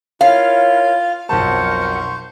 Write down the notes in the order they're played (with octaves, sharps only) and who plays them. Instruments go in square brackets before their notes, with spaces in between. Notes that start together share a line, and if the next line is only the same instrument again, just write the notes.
[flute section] E4 A#4 C#5 [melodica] F4 [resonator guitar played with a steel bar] F5
[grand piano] B1 F2 A5 [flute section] A#4 F#5 [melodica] C5 C#6